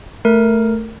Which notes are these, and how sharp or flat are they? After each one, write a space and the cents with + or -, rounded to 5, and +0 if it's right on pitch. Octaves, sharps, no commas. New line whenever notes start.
A3 +0 A#4 +0